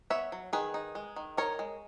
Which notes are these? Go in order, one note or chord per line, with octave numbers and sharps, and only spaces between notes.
B3 C#5 E5
F#3
D#3 G#4 B4
D#4
G#3
D#3
D#4 A#4 C#5
G#3